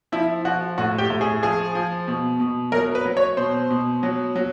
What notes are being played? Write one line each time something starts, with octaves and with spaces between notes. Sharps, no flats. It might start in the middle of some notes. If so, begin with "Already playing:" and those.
F3 E4
F3 F#4
A2 F#4
G4
A2
G#4
F3 G#4
F3
B2
B2
F#3 A#4
B4
F#3
C#5
B2 C5
B2
F#3
F#3